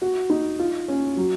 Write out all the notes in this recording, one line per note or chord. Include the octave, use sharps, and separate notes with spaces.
F#4
D#4
F4
C#4
F#3